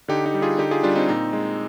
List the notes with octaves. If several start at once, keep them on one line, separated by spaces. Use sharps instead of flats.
D3 D#4 G4
D#4 G4
G3
F4 G#4
D3 D#4 G4
F4 G#4
G3 D4 F4
C4 D#4
A#2 C4 D#4
G#3